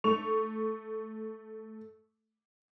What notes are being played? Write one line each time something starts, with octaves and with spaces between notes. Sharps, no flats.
A3 C#6 F7